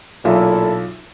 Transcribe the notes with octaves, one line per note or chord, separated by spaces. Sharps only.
B1 A#2 E4 F4 A4 E5